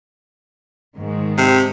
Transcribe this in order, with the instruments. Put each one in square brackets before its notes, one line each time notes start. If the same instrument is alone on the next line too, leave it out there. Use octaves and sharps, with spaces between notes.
[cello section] G#2 D#3 G#3
[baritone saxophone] C3